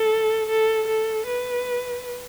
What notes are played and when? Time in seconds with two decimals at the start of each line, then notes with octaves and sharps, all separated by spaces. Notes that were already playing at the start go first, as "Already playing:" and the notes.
Already playing: A4
0.49 A4
0.88 A4
1.26 B4